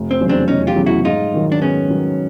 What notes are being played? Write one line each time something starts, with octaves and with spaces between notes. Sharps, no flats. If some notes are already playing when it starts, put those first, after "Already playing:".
Already playing: F1
C4
E2 C#3 F#3
C4 D4
F1 C#4 D#4
F4 G4
E2 C#3 F#3
E4 F#4
G#2 D#4 F4
D#3 F#3
D4
G#2 B3 C#4
D#3 F#3